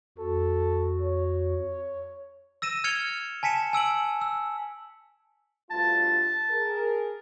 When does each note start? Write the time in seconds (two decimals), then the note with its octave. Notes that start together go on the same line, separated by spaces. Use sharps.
0.18 F2 F#4 A4
1.01 C#5
2.62 E6 A#6 D#7 E7
2.84 F6 G#6 C#7 F7 G7
3.43 G#5 A5 B6 C#7 E7
3.73 G#5 E6 D7 F#7
4.21 E6
5.71 D2 G2 F4 A5
6.50 G#4 A#4